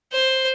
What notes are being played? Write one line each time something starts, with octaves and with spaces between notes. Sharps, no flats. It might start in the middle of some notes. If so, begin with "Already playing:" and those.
C5